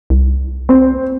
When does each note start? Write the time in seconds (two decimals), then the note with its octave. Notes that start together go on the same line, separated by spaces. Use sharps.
0.10 C2
0.69 C4